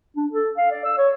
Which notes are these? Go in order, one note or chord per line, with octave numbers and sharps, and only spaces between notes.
D4
A4
F5
D5
E6
C#5